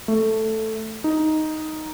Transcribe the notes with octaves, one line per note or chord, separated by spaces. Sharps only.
A3
D#4